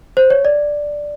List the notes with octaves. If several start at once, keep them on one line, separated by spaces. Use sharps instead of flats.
C5
C#5
D5